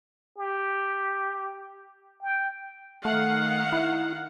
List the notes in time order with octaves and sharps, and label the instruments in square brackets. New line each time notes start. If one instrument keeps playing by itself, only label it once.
[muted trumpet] G4
G5
[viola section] D#3 F5 F#5 [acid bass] A3
[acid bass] E4